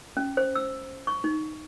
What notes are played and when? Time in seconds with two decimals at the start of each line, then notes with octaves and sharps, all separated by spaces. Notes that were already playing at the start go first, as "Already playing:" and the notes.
0.17 C#4
0.37 C5
0.55 E6
1.07 C#6
1.24 D#4